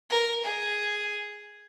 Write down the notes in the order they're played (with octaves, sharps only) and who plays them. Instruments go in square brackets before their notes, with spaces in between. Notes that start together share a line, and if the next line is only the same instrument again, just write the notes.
[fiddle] A#4
G#4